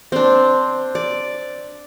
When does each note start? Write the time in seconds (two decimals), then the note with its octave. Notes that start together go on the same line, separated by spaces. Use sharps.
0.12 C4 D4
0.95 D5